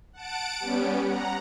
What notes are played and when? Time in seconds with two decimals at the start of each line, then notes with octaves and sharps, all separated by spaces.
0.13 F#5 A5 D7
0.60 G3 B3 C#4
1.05 F#5 A#5